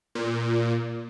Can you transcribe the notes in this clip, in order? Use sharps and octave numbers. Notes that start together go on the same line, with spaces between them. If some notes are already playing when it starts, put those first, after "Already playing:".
A#2